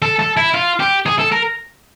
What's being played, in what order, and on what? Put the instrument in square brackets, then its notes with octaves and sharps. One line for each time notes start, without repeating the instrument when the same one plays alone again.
[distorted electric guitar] A4
A4
E4
F4
G4
G#4
A4
A#4